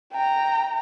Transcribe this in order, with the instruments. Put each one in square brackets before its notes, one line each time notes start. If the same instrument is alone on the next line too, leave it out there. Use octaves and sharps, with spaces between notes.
[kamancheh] G5 A#5